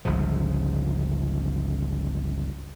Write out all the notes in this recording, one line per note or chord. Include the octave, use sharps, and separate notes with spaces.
G1 C#2 C#3 F3